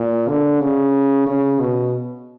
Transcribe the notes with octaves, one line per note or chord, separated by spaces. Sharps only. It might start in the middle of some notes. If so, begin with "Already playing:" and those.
Already playing: A#2
D3
C#3
C#3
B2